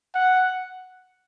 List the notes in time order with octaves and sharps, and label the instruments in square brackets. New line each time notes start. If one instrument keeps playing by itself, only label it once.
[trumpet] F#5